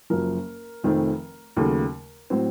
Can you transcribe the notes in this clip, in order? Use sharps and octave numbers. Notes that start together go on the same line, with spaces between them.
F#1 F#2 F3 A#4
F1 F2 D#3 A3 C4
D#2 C#3 F#3 A3
A2 F#3 C4